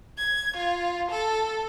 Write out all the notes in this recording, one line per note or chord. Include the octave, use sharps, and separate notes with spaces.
G#6
F4
A4